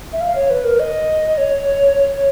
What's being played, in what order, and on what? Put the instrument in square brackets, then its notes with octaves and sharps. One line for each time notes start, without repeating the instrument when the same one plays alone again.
[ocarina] E5
F5
C#5
B4
A#4
D#5
C#5
C#5